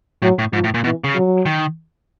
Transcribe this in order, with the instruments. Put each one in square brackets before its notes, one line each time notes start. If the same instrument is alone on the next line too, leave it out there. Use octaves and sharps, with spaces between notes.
[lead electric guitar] A2 [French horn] F#3
[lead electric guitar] A2
[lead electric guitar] G#2 [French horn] F3
[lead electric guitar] A2
A#2
[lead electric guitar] B2 [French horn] E3
[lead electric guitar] C#3
[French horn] F#3
[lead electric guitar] D#3